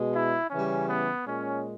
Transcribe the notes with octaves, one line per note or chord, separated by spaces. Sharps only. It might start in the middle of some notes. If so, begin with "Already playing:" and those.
Already playing: B2 G#3
E4
C#3 E3 G3 C#4
B3
A#2 G#3 C#4